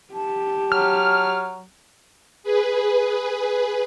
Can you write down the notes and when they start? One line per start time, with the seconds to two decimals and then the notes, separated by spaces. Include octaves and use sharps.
0.14 G4 A5
0.72 F#3 F6
2.43 G#4 B4